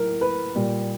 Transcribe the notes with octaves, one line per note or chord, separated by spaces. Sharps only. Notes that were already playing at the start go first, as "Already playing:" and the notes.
Already playing: A2 F#3 A#4
B4
A#2 G3